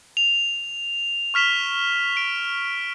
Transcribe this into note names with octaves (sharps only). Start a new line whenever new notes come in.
F7
C#6 F6 B6 E7 G7
D7